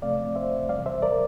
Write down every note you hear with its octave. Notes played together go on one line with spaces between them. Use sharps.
C3 F3 A3 C4 D5 F5
C5 E5
E2 C3 G3 D5 F5
C5 E5
A#4 D5